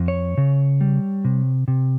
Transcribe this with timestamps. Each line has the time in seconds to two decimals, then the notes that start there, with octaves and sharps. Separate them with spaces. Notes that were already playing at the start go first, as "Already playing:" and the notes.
Already playing: F2
0.08 C#5
0.38 C#3
0.81 G3
1.25 C3
1.68 C3